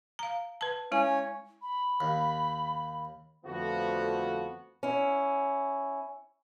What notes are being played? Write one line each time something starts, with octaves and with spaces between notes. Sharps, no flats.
F5 A#5
B4 A5
G#3 C#4 E4 C#5 G#5
B5
D#2
F2 D3 F3 A3 B3 F#4
C#4 E4